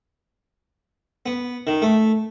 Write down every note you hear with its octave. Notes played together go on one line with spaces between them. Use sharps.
B3
D#3
A3